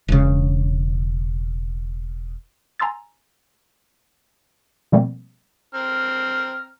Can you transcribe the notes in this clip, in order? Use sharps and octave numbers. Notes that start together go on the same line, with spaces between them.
E1 C#3
G#5 A#5 C6 E6 A6
B2 F3 G3 A3 A#3 C4
C4 A#5 F6